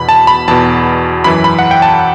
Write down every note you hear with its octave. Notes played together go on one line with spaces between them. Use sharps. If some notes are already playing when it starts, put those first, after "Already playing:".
Already playing: E2 B2 B5
A5
B5
E2 B2 A5
F#2 E3 B5
B5
F#5
G5
A5